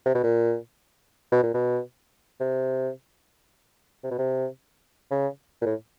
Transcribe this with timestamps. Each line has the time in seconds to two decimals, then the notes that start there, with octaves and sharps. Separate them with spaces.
0.06 C3
0.15 B2
0.23 A#2
1.32 B2
1.43 A#2
1.54 B2
2.40 C3
4.03 C3
4.11 B2
4.18 C3
5.11 C#3
5.61 A#2
5.66 A2